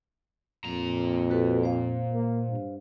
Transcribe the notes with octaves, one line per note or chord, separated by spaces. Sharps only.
F2 A#2 A#5
F#4 A4 B4
C5 F5
A#3
G2